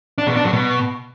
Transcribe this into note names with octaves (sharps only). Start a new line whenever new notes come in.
D4
B2
D4
F#3
B2